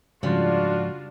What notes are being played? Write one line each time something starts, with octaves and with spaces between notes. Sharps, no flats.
G#2 C#3 F3 G3 D4 F4 F#4